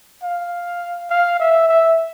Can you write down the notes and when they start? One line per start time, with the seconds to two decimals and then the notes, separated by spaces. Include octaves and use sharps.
0.23 F5
1.10 F5
1.40 E5
1.69 E5